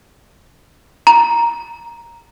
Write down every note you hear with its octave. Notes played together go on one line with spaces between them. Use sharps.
A#5